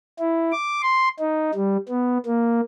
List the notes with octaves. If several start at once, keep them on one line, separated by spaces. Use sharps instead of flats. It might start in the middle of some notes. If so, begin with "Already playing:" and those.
E4
D6
C6
D#4
G3
B3
A#3